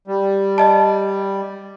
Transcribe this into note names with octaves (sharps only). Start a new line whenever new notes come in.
G3
D5 D#5 A5